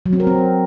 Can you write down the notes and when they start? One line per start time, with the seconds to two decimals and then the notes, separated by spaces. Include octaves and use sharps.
0.06 F#3
0.13 C4
0.20 A#4
0.27 C4